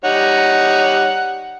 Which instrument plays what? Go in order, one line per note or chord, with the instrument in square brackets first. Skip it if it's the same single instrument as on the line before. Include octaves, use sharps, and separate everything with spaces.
[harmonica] G3 D#4 C#5 [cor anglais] F#5